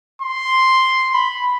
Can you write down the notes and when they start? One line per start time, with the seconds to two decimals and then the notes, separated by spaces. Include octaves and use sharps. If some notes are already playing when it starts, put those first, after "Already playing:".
0.22 C6
1.14 B5